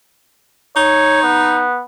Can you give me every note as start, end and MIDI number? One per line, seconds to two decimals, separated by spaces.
0.76 1.65 63
0.76 1.19 73
1.23 1.83 59